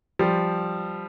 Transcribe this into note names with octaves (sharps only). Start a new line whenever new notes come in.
F3 G3